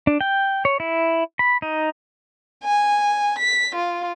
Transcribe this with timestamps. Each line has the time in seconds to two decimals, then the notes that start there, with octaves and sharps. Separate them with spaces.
0.07 D4
0.21 G5
0.65 C#5
0.80 E4
1.39 B5
1.62 D#4
2.64 G#5
3.39 B6
3.75 F4